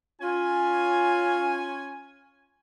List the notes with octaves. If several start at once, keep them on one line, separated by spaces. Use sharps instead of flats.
C#4 F4 G#5